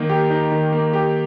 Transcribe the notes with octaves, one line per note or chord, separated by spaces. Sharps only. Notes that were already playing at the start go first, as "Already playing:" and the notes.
Already playing: D#3 A#3 D#4
G4
D#4
D#3
A#3
G4